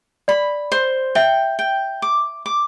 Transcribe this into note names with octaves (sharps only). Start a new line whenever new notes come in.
D5 B5
C5
E5 G5
G5
D6
D6